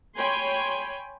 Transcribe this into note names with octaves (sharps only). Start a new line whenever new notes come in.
C#5 G5 G#5 B5 C6